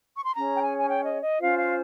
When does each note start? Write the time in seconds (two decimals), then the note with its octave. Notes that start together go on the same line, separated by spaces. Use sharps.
0.15 C#6
0.24 C6
0.35 C#4 G#4 C#5 A#5
0.55 G5
0.61 G#5
0.77 G#5
0.87 G5
1.04 D#5
1.23 D#5
1.39 C#4 F4 C5 F5
1.57 F5